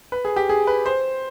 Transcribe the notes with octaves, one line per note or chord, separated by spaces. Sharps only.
B4
G#4
G4
G#4
B4
C5